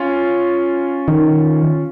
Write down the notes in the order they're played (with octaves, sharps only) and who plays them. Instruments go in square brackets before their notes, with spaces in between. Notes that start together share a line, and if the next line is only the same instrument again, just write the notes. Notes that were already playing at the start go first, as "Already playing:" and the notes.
Already playing: [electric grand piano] C#4 F4
[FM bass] D#3